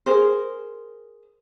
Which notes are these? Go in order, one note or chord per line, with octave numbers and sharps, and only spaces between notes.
G#4 A#4 C5